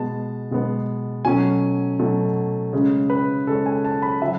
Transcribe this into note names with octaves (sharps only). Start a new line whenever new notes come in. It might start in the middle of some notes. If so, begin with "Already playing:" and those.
Already playing: B2 G#3 B3 A5
B2 G#3 B3
B2 F#3 A3 C#4 G#5
B2 F#3 A3 C#4
C#3 G#3 C#4
B4
C#3 G#3 C#4 A4
G#5
A5
B5
C#3 F#3 C#4 E5